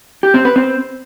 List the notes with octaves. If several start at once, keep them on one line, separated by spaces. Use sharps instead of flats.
G4
C4
B4
C4